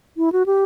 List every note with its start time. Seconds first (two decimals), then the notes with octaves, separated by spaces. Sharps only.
0.17 E4
0.32 F#4
0.46 G4